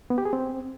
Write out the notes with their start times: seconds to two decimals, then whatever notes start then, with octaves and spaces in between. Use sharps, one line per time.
0.10 B3
0.18 G4
0.25 G#4
0.33 C4